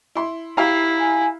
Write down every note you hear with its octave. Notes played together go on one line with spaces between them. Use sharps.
E4 C6
E4 G4 F5 A#5
G#5